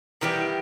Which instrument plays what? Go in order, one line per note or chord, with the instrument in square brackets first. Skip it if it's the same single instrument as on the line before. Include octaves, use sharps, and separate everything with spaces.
[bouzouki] D#3 G3 B3 G4 [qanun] E3